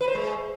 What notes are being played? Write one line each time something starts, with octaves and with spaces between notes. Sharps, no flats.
B4
C5
G#3